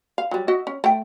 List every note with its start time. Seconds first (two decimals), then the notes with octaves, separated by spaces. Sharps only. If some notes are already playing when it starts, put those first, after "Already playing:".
0.18 F5
0.31 F#3 G3
0.48 F#4 D#5 E5
0.67 C#4
0.84 A3 G5